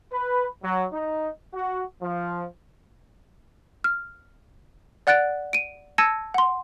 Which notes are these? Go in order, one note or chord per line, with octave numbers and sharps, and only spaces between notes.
B4
F#3
D#4
F#4
F3
F6
D5 F#5 F#6 A6 D7
D7 D#7
A5 E6 G#6 A#6 C#7 D#7
F#5 C6